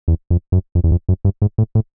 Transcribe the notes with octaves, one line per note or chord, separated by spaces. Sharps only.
E2
F2
F#2
F2
E2
F2
F#2
G2
G#2
A2
A2